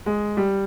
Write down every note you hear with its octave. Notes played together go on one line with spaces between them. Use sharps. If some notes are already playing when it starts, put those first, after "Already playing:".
G#3
G3